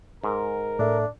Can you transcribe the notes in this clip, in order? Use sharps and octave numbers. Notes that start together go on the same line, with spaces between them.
G#2 A#4
A2 D4 A4 E5